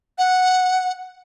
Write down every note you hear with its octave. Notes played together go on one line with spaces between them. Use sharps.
F#5